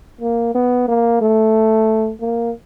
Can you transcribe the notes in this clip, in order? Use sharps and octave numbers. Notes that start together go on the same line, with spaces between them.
A#3
B3
A#3
A3
A#3